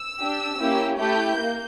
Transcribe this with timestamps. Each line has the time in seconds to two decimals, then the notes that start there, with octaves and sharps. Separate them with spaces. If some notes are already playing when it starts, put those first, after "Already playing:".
Already playing: E6
0.19 D4 G4
0.59 A#3 C#4 E4 G4
0.98 A3 E4 G4 G6
1.37 A#3